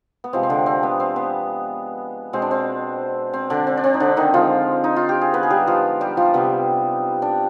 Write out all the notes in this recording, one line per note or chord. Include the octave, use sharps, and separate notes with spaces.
B3
C3 F3 G#3 C4
C4
D3 D4
C4
B3
C4
B3
B2 G#3 C4
D4
C4
C4
D3 D4
C4
D4
C4
D#4
D3 D4
D#3 D#4
D3 F3 G#3 F4
D#4
F4
G4
G#4
B3 B4
G#4
G3 G4
F3 F4
G3 G4
F3 F4
C3 G3 B3
D4